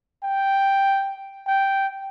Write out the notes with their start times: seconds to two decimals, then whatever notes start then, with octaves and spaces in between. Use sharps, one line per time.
0.23 G5
1.47 G5